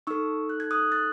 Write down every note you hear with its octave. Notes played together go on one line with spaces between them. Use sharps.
D#4 A4 C#6 E6
F#6
G#6
D#6 F#6
F#6 A6